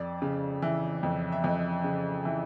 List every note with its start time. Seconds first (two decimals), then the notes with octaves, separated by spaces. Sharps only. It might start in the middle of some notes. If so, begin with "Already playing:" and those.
Already playing: F2 D5
0.22 C#3
0.62 E3
1.03 F2
1.32 E5
1.44 F2 D#5
1.84 C#3
2.25 E3